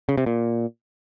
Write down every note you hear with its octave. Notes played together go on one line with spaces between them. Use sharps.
C#3
C3
A#2